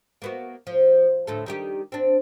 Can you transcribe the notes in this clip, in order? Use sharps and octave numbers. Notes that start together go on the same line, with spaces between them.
A#3 B3 F#4
F3
D2 A2 A4
D#3 G3 G4
C4 D4